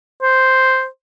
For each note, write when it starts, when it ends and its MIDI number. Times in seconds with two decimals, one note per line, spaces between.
0.22 0.86 72